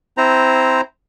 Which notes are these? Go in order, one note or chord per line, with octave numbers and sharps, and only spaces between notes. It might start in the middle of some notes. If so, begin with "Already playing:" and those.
C4 E4 C5 A#5